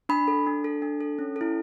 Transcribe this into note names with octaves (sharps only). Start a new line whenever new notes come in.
D4 B5
A4
D4
A4
D4
A4
C#4
E4 A4